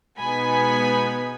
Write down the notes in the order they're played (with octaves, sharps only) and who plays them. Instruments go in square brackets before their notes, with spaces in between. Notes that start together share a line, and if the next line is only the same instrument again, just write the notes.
[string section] B2 G#3 B3 D#4 G#5 B5